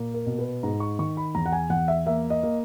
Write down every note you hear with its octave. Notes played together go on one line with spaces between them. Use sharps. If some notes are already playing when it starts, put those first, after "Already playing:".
Already playing: A#2 A#3
A#4
B2
B4
G#2 A#5
C#6
D#3 C#6
B5
E2 A#5
F#5
G#5
E2 F#5
E5
A#3 E5
D#5
A#3